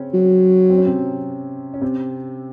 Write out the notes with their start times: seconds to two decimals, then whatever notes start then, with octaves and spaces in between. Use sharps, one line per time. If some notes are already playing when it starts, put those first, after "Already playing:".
Already playing: C#3 C4 C#4
0.14 F#3
0.70 C4
0.78 C#4
0.86 C3 C4
1.74 C#4
1.81 C3 C4